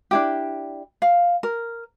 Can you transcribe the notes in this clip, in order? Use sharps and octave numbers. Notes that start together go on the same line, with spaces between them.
D4 E4 G4
F5
A#4